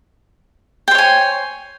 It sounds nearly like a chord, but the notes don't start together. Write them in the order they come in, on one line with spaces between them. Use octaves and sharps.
G5 C5 C#5 G#5